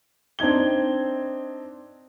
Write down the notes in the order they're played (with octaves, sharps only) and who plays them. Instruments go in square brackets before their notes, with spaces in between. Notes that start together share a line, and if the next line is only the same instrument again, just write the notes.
[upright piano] C4 D4 D#4 G#6 G7